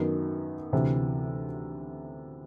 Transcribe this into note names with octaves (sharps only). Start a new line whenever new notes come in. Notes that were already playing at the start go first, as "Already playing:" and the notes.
Already playing: F#2 D#3 F#3 B3
D2 C3 E3